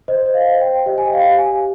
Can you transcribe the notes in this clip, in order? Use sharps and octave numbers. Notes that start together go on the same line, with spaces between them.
C5 D#5
D#5
F5
C5
G5
G4 D#5
G#5
G5
F5
G4
G#5